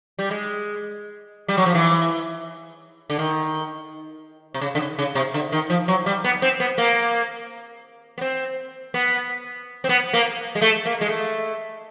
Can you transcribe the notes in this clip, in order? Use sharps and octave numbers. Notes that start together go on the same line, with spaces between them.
G3
G#3
G3
F#3
F3
E3
D3
D#3
C3
C#3
D3
C#3
C#3
C3
D3
D#3
F3
F#3
G3
B3
C4
B3
A#3
B3
C4
B3
C4
B3
A#3
G#3
A3
A#3
G#3
A3